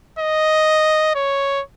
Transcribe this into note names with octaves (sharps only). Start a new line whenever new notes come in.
D#5
C#5